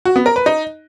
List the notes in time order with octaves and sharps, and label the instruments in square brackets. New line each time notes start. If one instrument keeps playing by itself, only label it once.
[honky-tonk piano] F#4
B3
A#4
B4
D#4